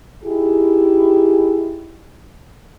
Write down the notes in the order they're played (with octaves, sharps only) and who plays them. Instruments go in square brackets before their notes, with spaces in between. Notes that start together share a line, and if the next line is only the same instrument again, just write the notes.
[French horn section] D#4 E4 G4 G#4